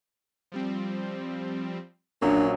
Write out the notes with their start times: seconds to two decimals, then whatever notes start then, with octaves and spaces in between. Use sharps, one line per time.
0.52 F3 G3 C4
2.22 A#1 F#3 A#3 C#4 D4